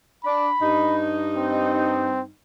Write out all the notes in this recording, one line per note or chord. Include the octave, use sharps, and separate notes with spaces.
D4 B5
G2 D#4
C4